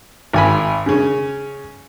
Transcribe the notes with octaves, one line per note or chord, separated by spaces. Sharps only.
G#1 G#5 B5
C#3 C#4